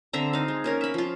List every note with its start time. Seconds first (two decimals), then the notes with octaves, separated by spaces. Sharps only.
0.13 D3 C4 E5 A#5
0.33 D#4 F5
0.48 G#3
0.64 A#3 C#4 A#4
0.81 E5 B5
0.94 F3 F4